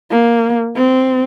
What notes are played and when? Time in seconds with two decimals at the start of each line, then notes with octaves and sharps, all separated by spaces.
0.11 A#3
0.76 C4